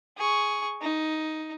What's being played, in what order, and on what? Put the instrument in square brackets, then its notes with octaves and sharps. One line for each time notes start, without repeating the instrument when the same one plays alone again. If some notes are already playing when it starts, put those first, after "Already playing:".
[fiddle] G#4 C#6
D#4